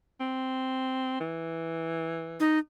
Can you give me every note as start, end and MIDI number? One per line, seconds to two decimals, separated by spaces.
0.20 1.16 60
1.20 2.39 52
2.40 2.59 63